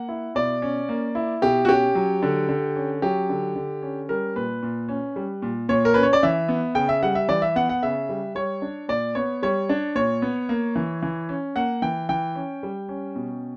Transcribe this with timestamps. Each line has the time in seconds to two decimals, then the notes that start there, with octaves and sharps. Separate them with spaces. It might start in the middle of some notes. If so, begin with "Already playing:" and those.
Already playing: A#3 F#5
0.09 E4
0.35 B2 D5
0.62 C#4
0.89 A#3
1.15 E4
1.42 B2 G4
1.65 F#4
1.69 C#4 G4
1.95 F#3
2.22 D3
2.49 D3
2.76 C#4
3.02 F#3 G4
3.29 D3
3.56 D3
3.82 C#4
4.09 G3 A#4
4.36 A#2 B4
4.63 A#2
4.89 C#4
5.16 G3
5.42 A#2
5.69 A#2 C#5
5.85 A#4
5.94 C#4 B4
6.03 C#5
6.13 D5
6.23 E3 E5
6.48 B3
6.75 C#3 G5
6.89 E5
7.03 G3 F#5
7.15 E5
7.28 E3 D5
7.42 E5
7.56 B3 F#5
7.69 F#5
7.83 C#3 E5
8.09 G3
8.35 G3 C#5
8.62 D4
8.89 A#2 D5
9.15 B3 C#5
9.43 G3 C#5
9.69 D4
9.95 A#2 C#5
10.22 B3
10.49 A#3
10.76 E3
11.03 E3
11.29 C#4
11.56 A#3 F#5
11.82 E3 G5
12.09 E3 G5
12.35 C#4
12.63 G3
12.89 C#4
13.15 B2